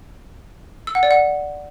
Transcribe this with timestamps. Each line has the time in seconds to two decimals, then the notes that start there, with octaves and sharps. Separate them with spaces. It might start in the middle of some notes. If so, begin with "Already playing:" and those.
0.87 E6
0.95 F#5
1.03 D5
1.11 F#5